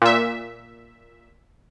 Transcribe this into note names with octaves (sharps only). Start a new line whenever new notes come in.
A#2 E5